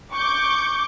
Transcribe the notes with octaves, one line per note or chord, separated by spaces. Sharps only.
C#6 D6 G6